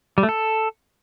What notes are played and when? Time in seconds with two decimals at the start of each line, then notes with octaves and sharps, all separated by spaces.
0.18 G3
0.23 A3
0.29 A4